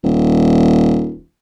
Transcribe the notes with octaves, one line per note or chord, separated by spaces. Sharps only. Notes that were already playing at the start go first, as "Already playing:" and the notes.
D#1